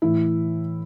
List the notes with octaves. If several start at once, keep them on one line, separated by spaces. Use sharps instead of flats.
A2 E3 E4